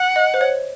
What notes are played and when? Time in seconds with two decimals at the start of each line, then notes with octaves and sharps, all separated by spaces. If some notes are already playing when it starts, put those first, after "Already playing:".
Already playing: F#5
0.16 D#5
0.34 C5
0.41 C#5